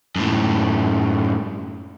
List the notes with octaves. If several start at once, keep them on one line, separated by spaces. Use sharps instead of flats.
F#2 A2